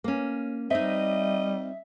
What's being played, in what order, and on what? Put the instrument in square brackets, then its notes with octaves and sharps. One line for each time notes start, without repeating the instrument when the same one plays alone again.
[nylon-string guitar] A#3 C#4
[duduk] G3 [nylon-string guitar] C4 D#4 [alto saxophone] D#5 [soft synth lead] E5